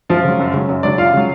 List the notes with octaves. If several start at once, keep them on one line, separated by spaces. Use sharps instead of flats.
F#2 F3 F4
C#3 F#3
F#2
C#3 F#3
F#2
C#3 F#3 D4 D5
F#2 F4 F5
C#3 F#3